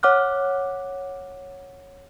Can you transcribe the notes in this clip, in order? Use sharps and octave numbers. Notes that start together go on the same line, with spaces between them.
C#5 F#5 D6 F6 F#6